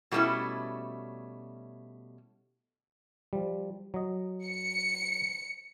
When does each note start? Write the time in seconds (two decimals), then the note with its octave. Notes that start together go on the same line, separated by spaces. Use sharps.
0.11 B2 G3 A3 A#3 C#4 E4
3.33 F3 G3
3.94 F#3 D#5
4.44 C#7